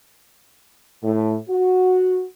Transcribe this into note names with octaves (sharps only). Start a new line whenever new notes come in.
A2
F#4